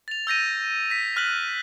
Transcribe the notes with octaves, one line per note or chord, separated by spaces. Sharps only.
A6 F7
E6 G6 A#6 D#7
A#6 B6
F6 F#6 B6 F#7